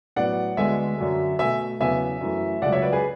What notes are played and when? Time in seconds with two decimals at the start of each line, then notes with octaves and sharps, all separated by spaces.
0.16 A2 F#3 B3 D5 F#5
0.57 D2 D3 G#3 B3 E5 G#5
0.98 F#2 D3 F#3
1.39 B2 A3 E5 G#5
1.80 E2 C#3 F#3 B3 E5 G#5
2.21 F#2 E3 A3
2.62 C#2 C#3 F#3 D5 F#5
2.72 C#5 E5
2.82 B4 D5
2.92 G#4 B4